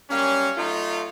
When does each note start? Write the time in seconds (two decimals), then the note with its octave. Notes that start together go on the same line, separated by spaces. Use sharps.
0.10 F#3 G3 A#3 C#4
0.57 F#3 A3 D#4 F4